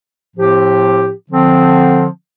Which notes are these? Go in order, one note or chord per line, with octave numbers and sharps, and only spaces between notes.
A2 F3 C4 G4
D3 F3 C4